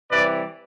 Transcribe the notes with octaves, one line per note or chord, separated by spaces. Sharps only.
C3 E3 G3 B4 D5